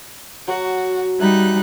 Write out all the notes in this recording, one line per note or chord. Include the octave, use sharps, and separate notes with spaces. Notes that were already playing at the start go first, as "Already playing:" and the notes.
F#3 F#4
G3 D#4 E5 F#6